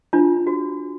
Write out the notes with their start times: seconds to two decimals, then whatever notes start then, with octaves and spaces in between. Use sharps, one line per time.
0.13 D4 F4
0.47 F#4